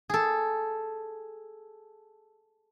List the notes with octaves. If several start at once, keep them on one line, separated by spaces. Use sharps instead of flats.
G#4 A4